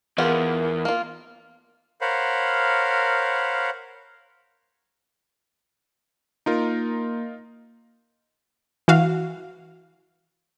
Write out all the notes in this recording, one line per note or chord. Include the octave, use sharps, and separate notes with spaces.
E2 B3 F4 G#4 A#4
A#3 F4
A#4 C5 C#5 F5 F#5 B5
A#3 D#4 F4 A#4
E3 F#4 F5